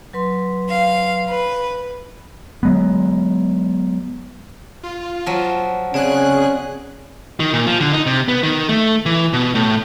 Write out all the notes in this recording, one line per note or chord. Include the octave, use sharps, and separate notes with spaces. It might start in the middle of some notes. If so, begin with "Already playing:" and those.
F#3 B4 C6
F5
B4
F#3 G#3 B3
F4
F3 F#3
C#3 C4 C#4 G#4 D5 F#6
D#3
A#2
F3
D3
D#4
C3
B3
D#3
A3
E3
B2
A2